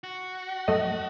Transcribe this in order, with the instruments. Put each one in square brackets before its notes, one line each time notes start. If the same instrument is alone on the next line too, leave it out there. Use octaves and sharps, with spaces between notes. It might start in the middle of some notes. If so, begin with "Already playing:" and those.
[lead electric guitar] F#4
[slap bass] F#2 F3 F#3 [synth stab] A3 D#5